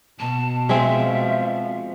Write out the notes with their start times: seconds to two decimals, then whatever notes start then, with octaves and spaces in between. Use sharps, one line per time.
0.20 B2 A5
0.69 F3 G#3 C4 E5